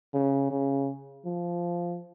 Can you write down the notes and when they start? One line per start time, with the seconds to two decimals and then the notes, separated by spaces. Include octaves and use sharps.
0.14 C#3
0.50 C#3
1.25 F3